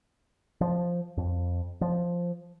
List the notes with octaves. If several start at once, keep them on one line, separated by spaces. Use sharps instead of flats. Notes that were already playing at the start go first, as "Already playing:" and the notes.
F3
F2
F3